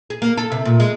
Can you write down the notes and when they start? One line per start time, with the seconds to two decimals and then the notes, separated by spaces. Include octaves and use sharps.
0.10 G#4
0.22 A#3
0.37 A4
0.52 C3
0.65 A#2
0.80 G#3